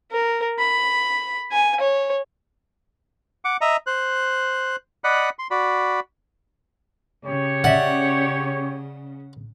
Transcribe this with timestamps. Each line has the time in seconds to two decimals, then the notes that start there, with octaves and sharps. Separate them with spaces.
0.12 A#4
0.59 B5
1.52 G#5
1.81 C#5
3.45 F#5 D6
3.61 D#5 E5 A#5
3.87 C5 F#6
5.04 D5 D#5 F#5 B5 F#6
5.39 C6
5.51 F#4 D5 B5
7.26 C#3 G4 C#5
7.64 D5 E5 F#5